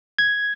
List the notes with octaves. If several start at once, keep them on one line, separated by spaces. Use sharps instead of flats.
G#6